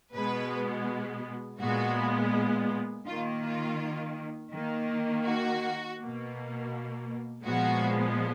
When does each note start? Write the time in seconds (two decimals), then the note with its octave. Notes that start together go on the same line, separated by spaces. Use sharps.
0.13 B2 G#3 B3 B4
1.60 A#2 G#3 B3 F#4
3.07 D#3 A#3 F4
3.43 F4
4.53 D#3 A#3
5.25 F#4
5.98 B2 A#3
7.44 A#2 F3 G#3 B3 F#4